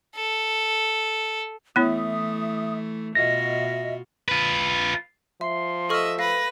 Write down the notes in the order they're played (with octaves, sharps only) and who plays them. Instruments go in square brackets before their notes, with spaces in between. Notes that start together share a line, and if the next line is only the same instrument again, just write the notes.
[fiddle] A4
[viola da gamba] E3 A3 [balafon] B3 E4 C#5 [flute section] E5 D#6
[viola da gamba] B2 F4 F#4 [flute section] D#5 E5 [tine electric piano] A#6
[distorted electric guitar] F4 B4
[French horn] F3 [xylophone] E5 [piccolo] C6
[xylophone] A4 C#6 F6 [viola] D#5 E5
[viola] B4 [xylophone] F5 [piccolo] A#6